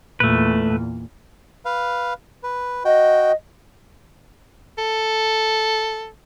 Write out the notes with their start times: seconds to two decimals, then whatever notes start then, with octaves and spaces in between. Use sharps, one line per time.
0.20 E2 A#2 A3 B4
1.65 B4 F5
2.43 B4
2.85 F#4 D#5 G5
4.78 A4